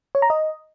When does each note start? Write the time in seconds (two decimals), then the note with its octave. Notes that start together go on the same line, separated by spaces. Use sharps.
0.15 C#5
0.22 A#5
0.30 D#5